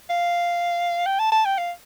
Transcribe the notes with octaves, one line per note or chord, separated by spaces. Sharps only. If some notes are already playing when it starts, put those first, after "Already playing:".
F5
G5
A5
A5
G5
F5